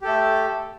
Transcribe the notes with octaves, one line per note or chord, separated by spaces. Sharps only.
A3 G4 A4